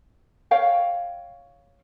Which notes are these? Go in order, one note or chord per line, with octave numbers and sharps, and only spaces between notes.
C#5 F5 G5